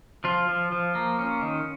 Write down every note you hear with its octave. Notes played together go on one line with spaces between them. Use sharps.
F3 F4
F3
F3
A#3
C#4
D#3